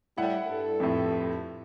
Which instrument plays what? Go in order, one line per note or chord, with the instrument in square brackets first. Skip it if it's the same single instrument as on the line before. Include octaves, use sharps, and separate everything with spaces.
[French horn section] A2 G3 [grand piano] E4 F#5
[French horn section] G2 A4
[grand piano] F2 A2